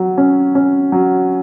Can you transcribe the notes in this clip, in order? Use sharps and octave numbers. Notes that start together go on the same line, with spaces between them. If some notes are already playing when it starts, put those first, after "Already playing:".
Already playing: F#3
C#4
C#4
F#3